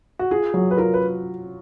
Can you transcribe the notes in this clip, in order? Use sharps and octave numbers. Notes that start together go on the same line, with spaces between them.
F#4
F4 G#4
F#3
B4
F4 A#4
B4